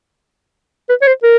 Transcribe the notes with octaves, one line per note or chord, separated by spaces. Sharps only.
B4
C#5
C5
A#4